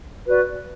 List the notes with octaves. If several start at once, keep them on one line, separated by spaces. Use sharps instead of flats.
F#4 B4 D5